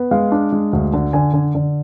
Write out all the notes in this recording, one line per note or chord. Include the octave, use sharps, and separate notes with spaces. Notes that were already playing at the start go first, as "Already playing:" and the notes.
Already playing: B3
G#3 F5
D4
G#3
D2
D3
D3 G#5
D3
D3